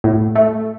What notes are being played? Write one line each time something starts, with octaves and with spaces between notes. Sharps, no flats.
A2
A3